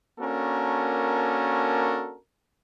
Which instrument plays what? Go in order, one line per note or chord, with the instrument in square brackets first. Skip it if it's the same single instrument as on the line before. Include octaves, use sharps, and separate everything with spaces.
[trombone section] A#3 C#4 D4 F#4 A4 A#4